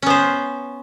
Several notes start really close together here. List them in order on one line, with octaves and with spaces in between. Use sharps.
C#4 B3 C5